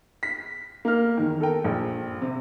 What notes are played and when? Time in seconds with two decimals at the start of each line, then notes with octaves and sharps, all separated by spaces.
0.23 B6
0.85 A#3 F6
1.17 E2 D#3
1.40 A4 A#4 G5
1.64 A#1
2.22 C3